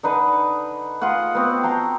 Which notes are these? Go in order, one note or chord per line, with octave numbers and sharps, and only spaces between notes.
D3 D#4 B4 D#5
F4 G#4 D#5 F#5
B3 C4 F#4
G5 A5 A#5 C6